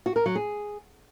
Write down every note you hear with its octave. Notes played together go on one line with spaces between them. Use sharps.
F#4
A#4
F#3
G#4